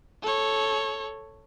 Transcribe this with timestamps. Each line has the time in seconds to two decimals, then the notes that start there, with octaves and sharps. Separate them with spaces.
0.22 A4 C#5